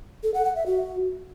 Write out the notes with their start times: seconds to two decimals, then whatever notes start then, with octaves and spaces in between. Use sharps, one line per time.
0.23 A4
0.34 F#5
0.45 F#5
0.56 E5
0.66 F#4